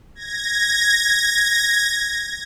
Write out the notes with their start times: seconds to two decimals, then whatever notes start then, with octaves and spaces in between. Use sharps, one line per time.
0.15 G#6 A#6